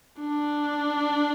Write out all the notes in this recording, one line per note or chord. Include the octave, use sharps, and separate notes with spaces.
D4